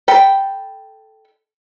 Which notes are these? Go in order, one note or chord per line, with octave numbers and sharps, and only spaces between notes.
A4 G5 B5